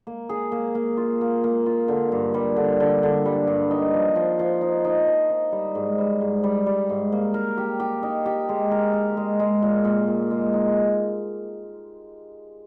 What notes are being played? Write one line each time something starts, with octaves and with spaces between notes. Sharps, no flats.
A#3
G#4
A#3
A#3
F4
A#3
A#3
F4
D3
G2
G3
D3
D3
D3
G3
G2
D#4
F3
F3
F3
D#4
D#4
F3
D#4
G3
G#2
G3
G#2
G3
G3
G#2
A#3
A#4
G4
G4
D#4
G4
G#3
A#4
A#4
G#3
G#3
A#2
A#2
A#2
G#3
D#4